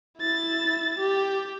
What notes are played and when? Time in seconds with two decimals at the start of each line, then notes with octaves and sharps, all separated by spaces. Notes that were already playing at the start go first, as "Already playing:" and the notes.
0.18 E4 A6
0.99 G4